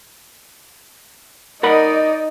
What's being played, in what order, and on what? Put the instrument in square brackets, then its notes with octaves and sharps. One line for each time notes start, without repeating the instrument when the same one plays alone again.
[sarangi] D#4 [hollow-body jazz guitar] A#4 F#5 B5 [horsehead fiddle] D5 D#5